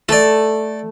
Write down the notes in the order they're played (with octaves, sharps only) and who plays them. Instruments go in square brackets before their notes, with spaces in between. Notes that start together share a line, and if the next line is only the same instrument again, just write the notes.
[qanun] A3 [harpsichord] A4 D5